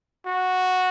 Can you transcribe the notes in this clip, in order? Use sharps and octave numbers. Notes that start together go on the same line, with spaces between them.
F#4